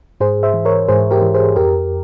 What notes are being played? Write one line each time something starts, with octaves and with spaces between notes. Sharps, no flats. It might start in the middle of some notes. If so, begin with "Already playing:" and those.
G#2 G#4 C5
C5 E5
E3
A#4 C#5
G#2 G#4 C5
G4 A#4
E3
G#4 C5
F2 G4 A#4